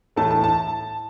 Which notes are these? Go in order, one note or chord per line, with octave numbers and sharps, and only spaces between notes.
A2 E3 A3 A5
A5
A5